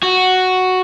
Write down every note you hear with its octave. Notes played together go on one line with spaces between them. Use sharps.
F#4